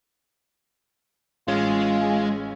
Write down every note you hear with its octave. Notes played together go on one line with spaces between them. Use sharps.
A1 G#3 C#4 F4 G#6